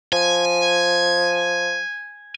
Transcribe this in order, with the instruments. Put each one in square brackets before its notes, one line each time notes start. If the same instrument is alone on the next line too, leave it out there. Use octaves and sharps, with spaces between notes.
[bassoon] F3 [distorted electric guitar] G#5